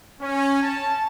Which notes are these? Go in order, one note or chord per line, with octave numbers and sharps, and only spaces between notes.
C#4
A5